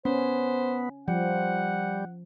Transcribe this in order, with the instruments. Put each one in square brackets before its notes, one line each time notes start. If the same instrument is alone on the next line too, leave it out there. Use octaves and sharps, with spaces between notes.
[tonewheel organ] B3 [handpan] C#4 [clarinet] C5
[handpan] F3 [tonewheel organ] G3 [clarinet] F#5